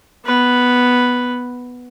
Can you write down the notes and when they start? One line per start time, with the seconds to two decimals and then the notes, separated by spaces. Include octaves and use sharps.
0.25 B3 B4